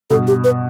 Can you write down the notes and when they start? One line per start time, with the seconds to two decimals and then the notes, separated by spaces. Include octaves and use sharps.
0.10 G2 B2 A4
0.27 G4
0.44 B4